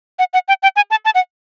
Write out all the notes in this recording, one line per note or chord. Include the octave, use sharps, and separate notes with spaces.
F#5
F#5
G5
G5
G#5
A5
A5
F#5